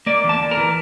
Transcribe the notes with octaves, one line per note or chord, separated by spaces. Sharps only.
A#3 D5
E2
A5
E2
A#4
E3